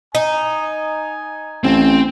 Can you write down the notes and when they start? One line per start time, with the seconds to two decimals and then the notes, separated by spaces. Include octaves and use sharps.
0.15 D#4 G#5
1.64 A1 C4